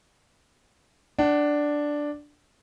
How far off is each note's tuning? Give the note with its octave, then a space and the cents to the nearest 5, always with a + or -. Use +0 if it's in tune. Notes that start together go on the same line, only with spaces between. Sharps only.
D4 +0 F#5 +25